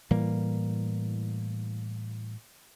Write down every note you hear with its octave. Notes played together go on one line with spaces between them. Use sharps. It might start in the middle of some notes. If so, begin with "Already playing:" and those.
A2 E3 G3 A#3